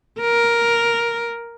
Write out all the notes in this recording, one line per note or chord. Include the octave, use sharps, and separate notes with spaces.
A#4